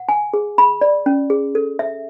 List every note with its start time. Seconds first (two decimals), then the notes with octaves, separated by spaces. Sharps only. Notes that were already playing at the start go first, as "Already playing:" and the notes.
Already playing: F#5
0.09 G#5
0.33 G#4
0.58 B5
0.81 D5
1.06 C#4
1.30 G#4
1.55 A4
1.79 E5